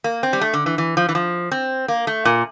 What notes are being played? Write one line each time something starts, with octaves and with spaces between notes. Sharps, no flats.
A#3
C4
G3
A3
D3
E3
E3
F3
E3
F3
C4
A#3
A3
A#2